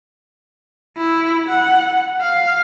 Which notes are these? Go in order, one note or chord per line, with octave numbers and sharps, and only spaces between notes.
E4
F#5
F5